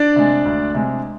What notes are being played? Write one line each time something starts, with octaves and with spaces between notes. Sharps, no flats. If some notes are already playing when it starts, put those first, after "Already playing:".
Already playing: D4 D5
C3 G#3
D2
C3 G#3